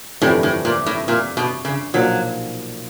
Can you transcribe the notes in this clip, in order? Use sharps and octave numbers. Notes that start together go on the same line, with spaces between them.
G1 F2 A2 C3 E3 G3
A2
A#2
A2
A#2
B2
C#3
B1 A#2 F3 F#3